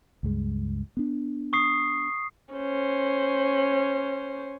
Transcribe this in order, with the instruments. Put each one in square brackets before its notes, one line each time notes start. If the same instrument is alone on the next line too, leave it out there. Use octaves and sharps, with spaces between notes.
[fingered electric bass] C#2 G2 G#3
B3 D4
[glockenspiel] C#6 D#6 C7
[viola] C#4 C5